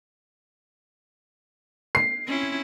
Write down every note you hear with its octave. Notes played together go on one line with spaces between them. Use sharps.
C7
C4 C#4 E4